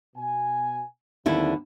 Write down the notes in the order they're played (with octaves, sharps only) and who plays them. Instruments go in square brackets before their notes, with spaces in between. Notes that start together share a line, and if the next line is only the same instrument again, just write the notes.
[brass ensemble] B2 G#5
[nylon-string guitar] D#2 D3 E4 [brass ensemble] D#3 F#3 C4